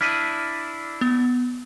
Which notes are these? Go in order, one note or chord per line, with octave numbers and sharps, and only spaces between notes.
D4 E4 F6 B6 D#7
B3